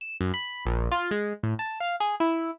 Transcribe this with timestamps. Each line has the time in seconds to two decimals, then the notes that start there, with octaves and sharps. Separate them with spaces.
0.01 E7
0.21 F#2
0.34 B5
0.66 A#1
0.92 F4
1.11 G#3
1.43 A2
1.59 A5
1.80 F5
2.00 G#4
2.20 E4